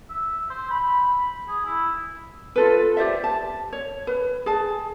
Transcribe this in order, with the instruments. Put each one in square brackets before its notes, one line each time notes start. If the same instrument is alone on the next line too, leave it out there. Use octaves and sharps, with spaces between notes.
[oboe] E5
C5
B5
G#4
E4
[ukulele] F4 A4 B4
G4 C5 D5 E5
A5
C#5
B4
G#4 A5